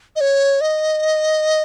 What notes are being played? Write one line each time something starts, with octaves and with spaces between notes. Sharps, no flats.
D#5
C#5
D#5